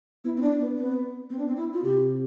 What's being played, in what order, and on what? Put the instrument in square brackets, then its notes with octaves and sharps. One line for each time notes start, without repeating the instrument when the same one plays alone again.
[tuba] B3 [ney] E4
[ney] C4
D4
B3
[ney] B3 [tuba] C4
[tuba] B3 [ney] C4
[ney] D4
C4
E4
F4
[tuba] C3 [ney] G4